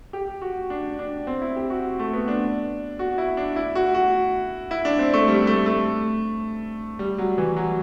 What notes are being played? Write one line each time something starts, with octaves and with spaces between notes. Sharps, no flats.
G4
F#4
D4
D4
C4
E4
G4
F#4
A3
B3
D4
F#4
E4
D4
E4
F#4
F#4
E4
D4
C4
A3
G3
A3
A3
G3
F#3
E3
F#3